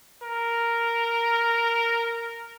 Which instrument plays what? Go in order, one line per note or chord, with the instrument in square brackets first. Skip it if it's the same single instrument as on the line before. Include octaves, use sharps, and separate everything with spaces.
[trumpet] A#4